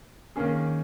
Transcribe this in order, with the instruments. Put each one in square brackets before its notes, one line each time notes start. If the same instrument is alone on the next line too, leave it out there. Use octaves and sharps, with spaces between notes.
[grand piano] D#3 A#3 C#4 G#4